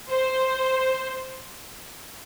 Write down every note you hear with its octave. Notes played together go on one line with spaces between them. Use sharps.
C5